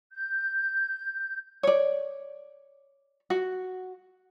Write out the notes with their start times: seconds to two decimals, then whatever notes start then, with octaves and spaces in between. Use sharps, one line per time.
0.13 G6
1.63 C#5 D5
3.30 F#4